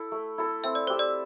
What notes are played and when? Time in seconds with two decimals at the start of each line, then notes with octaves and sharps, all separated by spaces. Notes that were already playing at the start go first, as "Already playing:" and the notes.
Already playing: E4 A4
0.12 A3
0.38 E4 A4
0.64 C4 E5
0.75 D5
0.87 G4 C5 E5
0.99 D5